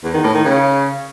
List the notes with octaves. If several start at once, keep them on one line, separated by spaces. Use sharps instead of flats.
E2
D#3
A2
D#3
C#3